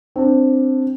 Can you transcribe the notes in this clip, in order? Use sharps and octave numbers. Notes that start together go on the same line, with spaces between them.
C4 D4